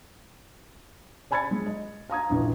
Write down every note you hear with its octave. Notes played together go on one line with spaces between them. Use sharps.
D5 G#5 B5 G#6 A6 C#7
G#3
D#5
F5 A#5 D#6 G#6
A#1 E2 G2